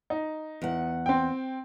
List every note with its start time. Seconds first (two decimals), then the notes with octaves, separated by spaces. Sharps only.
0.10 D#4
0.62 E2 F#5
1.06 C4 G5